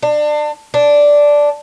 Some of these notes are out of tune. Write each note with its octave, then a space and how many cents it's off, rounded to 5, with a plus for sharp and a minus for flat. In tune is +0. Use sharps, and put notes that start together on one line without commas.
D4 +30
D4 -5